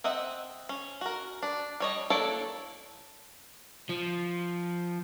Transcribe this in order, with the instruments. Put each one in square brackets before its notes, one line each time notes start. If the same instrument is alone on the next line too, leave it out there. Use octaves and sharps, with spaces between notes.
[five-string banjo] C4 D#5 E5 F#5
C#4
F#4 A#4
D4
G3 C#5 D#5
A#3 D4 E4 A4 C#5
[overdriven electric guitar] F3